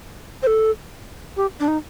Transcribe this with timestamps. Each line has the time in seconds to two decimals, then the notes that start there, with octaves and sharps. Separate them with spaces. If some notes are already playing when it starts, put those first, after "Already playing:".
0.43 C5
0.47 A4
1.37 G4
1.60 D4
1.68 D#4